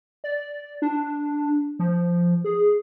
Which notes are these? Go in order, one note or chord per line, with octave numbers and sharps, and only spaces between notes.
D5
D4
F3
G#4